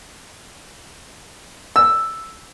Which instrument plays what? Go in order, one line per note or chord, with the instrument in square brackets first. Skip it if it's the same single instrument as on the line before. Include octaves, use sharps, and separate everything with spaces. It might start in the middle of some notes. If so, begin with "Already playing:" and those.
[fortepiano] E6